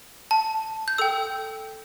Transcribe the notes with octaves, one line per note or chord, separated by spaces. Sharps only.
A5
G6
A4 G5 E6